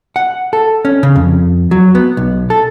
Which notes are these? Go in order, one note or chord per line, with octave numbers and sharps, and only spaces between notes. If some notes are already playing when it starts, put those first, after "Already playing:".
F#5
A4
C#4
C#3
F2
F#3
B3
B1
A4